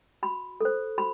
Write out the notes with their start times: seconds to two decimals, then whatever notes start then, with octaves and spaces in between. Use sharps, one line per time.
0.23 F#4 B5
0.60 A4 C5
0.98 F#4 B5